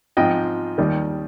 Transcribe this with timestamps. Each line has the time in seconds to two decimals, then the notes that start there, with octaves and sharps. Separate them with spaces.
0.17 G#2 F3 C4 D#5 G5
0.78 D#2 D#3 G3